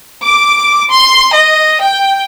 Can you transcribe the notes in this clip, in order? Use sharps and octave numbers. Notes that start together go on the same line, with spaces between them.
D6
C6
D#5
G5